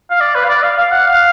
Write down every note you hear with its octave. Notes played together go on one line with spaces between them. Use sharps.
F5
D5
B4
F5
D5
F5
F5
F#5
F5